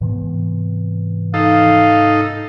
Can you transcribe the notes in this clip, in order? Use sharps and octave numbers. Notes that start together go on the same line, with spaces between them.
G#2 C3 E3 B3
D#4 A4 F5